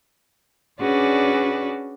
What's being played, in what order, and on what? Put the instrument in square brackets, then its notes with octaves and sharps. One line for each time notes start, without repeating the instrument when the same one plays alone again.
[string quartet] C#4 D4 F#4 G#4 B4 D5